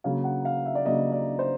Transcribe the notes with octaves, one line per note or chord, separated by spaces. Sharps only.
C#3 F#3 A#3 F5
F#5
F5
E5
D5
C#3 F#3 A#3 D#5
D5
C5